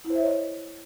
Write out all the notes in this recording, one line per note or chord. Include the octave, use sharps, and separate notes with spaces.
E4
C5
E5
C#5
D#5